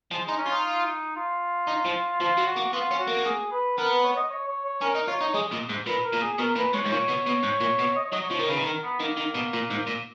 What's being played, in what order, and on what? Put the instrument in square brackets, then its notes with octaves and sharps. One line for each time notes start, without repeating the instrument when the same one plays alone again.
[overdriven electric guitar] F3 [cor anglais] G#3
[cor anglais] G#3 [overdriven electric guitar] D#4
[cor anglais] C#4
[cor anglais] D#4 [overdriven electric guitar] F4
[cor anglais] F4
[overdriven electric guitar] D#4
F3
[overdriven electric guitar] F3 [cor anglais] F4
[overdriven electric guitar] F#3
[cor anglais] F#4
[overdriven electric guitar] A#3
[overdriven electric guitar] B3 [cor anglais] F4
[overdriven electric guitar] C#4
[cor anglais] F#4
[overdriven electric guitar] A#3
[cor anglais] G#4
B4
[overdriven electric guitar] B3 [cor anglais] A#4
[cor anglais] B4
C#5
D#5
C#5
C#5
C#5
[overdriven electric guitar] C#4 [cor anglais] A#4
[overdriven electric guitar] D#4
[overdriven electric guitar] F4 [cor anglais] C#5
[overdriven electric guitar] D#4
[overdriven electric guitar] G#3 [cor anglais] D#5
[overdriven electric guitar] A#2
G#2
[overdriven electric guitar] A#2 [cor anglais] B4
[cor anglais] A#4
[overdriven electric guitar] A#2
[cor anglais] G#4
G#4
[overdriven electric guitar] B2 [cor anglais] A#4
[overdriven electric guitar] A#2 [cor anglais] B4
[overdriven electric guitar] G#2 [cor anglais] C#5
[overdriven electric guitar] G#2
[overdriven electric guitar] A#2 [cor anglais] C#5
[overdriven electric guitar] B2
B2
G#2
A#2
B2
[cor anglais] D#5
C#5
[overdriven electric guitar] F#3 [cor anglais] D#5
[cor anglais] C#5
[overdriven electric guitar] F3
D#3
[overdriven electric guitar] C#3 [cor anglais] B4
[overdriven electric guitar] D#3
[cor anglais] A#4
B3
[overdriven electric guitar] D#3 [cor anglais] A#3
[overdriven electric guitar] D#3
B2
A#2
G#2
A#2